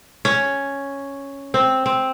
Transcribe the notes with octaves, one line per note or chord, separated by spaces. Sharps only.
C#4
C4
C4